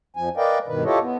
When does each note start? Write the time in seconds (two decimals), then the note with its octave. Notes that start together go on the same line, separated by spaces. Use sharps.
0.16 F2 F3 G#5
0.37 A#4 B4 D5 D#5 F5 G5
0.68 G2 B2 D#3 B4
0.84 E4 F4 G4 A4 C#5 D#5
1.01 B3